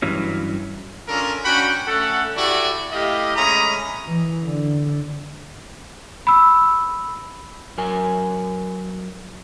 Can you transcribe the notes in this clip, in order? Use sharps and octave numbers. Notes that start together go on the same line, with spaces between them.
G2 E3 F#3 C#4
C#4 D4 F4 A4 A#4
C#4 D4 F#4 F#5 G5 B5
A3 C#4 A4 F#5
E4 F#4 G4 A4 D5
A3 E4 G4 D#5 F5
G#3 A3 C#4 A#5 B5 D#6
E3
D3
B5 E6
F#3 A#4 G#5